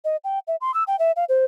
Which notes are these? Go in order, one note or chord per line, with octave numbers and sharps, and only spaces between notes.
D#5
G5
E5
C6
E6
G5
E5
F5
C5